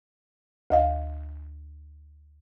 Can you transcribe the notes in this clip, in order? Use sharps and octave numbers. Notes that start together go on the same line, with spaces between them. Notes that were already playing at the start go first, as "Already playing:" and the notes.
D2 D#5 F5